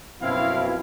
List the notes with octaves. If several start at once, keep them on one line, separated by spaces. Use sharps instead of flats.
F#2 B2 F3 C4 E4 F5